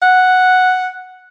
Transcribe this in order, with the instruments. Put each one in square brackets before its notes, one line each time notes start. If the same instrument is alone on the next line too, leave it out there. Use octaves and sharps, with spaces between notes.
[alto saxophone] F#5